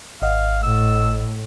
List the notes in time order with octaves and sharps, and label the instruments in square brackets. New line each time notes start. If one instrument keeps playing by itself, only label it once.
[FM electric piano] G#1 D#5 F#5 [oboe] F5
[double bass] A2 [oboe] E6